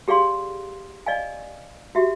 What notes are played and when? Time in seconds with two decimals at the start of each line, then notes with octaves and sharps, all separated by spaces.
0.08 G4 G#4 D5 F5 C6
1.06 D5 D#5 F5 G#5
1.95 F#4 G4 E5